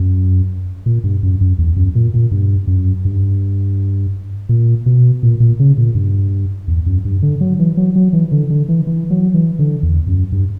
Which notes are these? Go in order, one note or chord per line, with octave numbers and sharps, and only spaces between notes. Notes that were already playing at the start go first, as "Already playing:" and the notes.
Already playing: F#2
A#2
G2
F#2
F#2
E2
F#2
A#2
A#2
G2
F#2
G2
A#2
B2
A#2
A#2
C#3
A#2
G2
E2
F#2
G2
D3
F#3
E3
F#3
F#3
E3
D3
D3
E3
E3
F#3
E3
D3
E2
F#2
G2